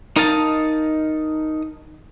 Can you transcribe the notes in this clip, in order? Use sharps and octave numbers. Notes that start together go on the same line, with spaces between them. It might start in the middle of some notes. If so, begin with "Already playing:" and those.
D#4 A#4 D#5 F5 A5